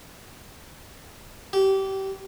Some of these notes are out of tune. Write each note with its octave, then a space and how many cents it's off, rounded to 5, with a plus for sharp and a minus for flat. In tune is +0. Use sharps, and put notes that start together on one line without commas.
G4 -25